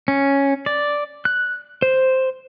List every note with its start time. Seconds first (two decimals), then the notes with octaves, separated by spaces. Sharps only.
0.08 C#4
0.66 D5
1.25 F#6
1.82 C5